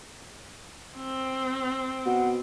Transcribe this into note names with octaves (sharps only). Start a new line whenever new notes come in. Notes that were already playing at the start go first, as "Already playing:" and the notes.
C4
B2 F#5